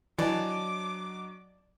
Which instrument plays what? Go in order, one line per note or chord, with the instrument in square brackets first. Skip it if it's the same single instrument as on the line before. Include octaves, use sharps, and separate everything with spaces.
[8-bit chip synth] E3 [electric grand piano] F#3 D4 D#5 [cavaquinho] D5 A5 [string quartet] D6